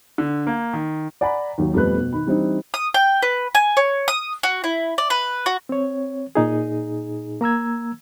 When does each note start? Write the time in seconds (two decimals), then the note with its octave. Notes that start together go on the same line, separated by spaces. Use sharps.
0.18 D3
0.47 A#3
0.73 D#3
1.21 D5 F#5 G#5 A#5 B5
1.58 D#2 D#3 F#3
1.74 F2 B2 G3 A3 B4 F#6
1.97 B2
2.13 D#3 B5
2.27 E3 G3 C4 D4 D#4
2.74 D#6
2.94 G5
3.22 B4
3.55 G#5
3.77 C#5
4.08 D#6
4.43 F#4
4.64 E4
4.98 D5
5.10 B4
5.46 F#4
5.69 C4 C#5
6.35 A#2 D#4 G#4
7.41 A#3 A#5 E6 G#6